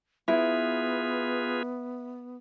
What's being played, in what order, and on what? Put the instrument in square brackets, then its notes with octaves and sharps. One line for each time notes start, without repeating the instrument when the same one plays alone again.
[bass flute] B3 [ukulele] E4 [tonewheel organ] F4 G#4 B4